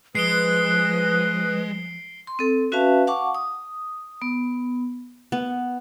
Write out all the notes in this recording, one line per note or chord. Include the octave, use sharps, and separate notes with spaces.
F3 G#3 B4 D#6 F#6 C7 D7 G7
C6
C4 A4
C#4 F#4 B4 E5 F5 A5
F5 F#5 A5 C#6 D6
D#6
B3
B3